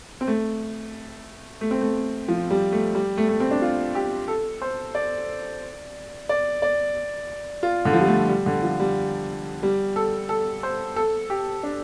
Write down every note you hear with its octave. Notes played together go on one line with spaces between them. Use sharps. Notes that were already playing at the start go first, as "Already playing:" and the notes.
C4
A3
A3
C4
A3
F3
G3
A3
G3
A3
A3
C4
D4
F4
G4
A4
C5
D5
D5
D5
F4
D3
F3
G3
A3
G3
D3
F3
G3
G3
A4
A4
C5
A4
G4
D4